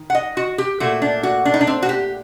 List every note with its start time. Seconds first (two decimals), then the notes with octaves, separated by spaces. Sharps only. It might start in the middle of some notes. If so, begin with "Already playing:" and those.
Already playing: D#3
0.10 F#5
0.15 D#5
0.37 F#4
0.58 G4
0.80 A#2 A3 F#4
1.02 D4
1.23 F#4
1.45 D4
1.54 D#4
1.61 D4
1.67 C4
1.83 F#4
1.89 G4